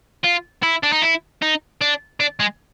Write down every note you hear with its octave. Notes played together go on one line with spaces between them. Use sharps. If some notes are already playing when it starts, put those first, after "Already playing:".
F4
E4
D4
D#4
E4
D#4
D4
D4
G#3